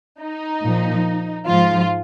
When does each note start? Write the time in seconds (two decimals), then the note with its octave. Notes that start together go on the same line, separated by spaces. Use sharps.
0.21 D#4
0.63 A#2 F3
1.46 G#2 F3 F4